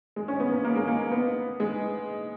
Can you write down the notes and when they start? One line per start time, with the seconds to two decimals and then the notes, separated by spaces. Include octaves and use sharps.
0.16 G#3
0.28 C#4
0.40 B3
0.52 A#3
0.64 A#3
0.76 G#3
0.88 A#3
1.12 B3
1.60 G#3